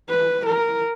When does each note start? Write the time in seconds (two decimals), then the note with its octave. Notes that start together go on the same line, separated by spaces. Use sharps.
0.09 B4
0.46 A#4